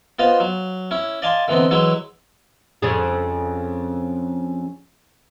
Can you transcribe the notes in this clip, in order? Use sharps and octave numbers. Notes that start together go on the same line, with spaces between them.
B3 F4 C5 D#5 F5
F#3
C#4 E4
D5 D#5 F5 G#5 A5 C6
D3 E3 B3 C4 D#4
E3 F#3 G#3 E4
F2 C#3 G#4